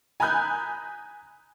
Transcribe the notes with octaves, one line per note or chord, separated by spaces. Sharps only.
G#5 A#5 B5 D#6 F#6 G6